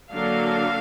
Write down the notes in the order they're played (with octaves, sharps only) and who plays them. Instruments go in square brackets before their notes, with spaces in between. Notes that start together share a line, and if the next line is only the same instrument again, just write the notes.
[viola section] D3 F#3 A#3 D4 F5